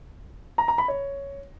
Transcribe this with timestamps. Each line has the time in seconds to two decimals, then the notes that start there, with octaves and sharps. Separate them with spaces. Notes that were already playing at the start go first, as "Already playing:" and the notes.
0.58 A#5
0.68 A#5
0.78 B5
0.88 C#5